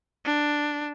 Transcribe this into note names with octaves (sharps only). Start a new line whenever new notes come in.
D4